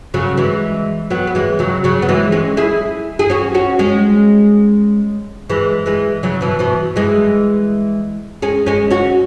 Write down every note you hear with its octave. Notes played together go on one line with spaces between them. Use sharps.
C#3 F#3
E3 G#3
F#3 B3
B3
E3 G#3
C#3 F#3
C#3 F#3
B3
E3 G#3
G#3 C#4
E4 G#4
G#4
C#4 F#4
C#4 F#4
G#3 C#4
E3 G#3
E3 G#3
C#3 F#3
B2 E3
B2 E3
E3 G#3
G#3 C#4
G#3 C#4
C#4 F#4